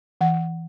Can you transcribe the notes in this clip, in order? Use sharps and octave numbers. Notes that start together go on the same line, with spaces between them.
E3 F#5